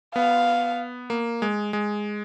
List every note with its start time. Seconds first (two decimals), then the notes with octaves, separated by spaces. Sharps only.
0.15 B3 F5
1.10 A#3
1.42 G#3
1.73 G#3